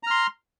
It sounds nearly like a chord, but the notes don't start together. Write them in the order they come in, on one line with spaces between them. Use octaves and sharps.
A#5 F6 C6